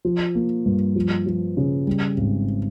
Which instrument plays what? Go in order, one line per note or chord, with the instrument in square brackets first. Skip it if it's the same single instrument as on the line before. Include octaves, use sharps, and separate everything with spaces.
[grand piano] F3
A#3
G2
F3
F3
C#3
G3
G#1